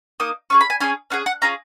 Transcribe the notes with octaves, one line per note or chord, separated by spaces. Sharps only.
A#3 D#4 D#6
C#4 F4 G#4 C#6
B5
G#5
C#4 F4 G#4 G#5
C#4 F4 G#4 F#5
F#5
C#4 F4 G#4 A#5